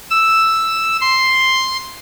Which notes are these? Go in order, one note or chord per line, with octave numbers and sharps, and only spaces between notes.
E6
C6